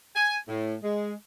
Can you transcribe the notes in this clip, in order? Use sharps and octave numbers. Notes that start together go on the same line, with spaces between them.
G#5
A2
G#3